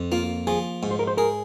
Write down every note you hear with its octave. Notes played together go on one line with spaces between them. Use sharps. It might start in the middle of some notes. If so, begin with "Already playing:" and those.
Already playing: F2
A#3 F4
F3 G#4
G#2
C5
A#4
C5
G#4 A#4